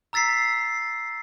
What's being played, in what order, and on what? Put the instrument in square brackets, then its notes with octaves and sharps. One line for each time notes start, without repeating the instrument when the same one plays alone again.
[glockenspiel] A#5 E6 A6 B6 C7